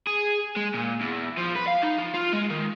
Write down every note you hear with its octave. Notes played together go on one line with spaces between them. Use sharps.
G#4
G#3
A#2
E2
F3
B4
F5
D#4
F3
F4
G#3
D#3